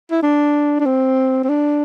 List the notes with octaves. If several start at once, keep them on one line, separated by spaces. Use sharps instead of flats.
E4
D4
D4
C4
C4
D4